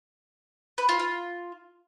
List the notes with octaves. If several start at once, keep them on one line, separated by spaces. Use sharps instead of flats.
B4
F4
F4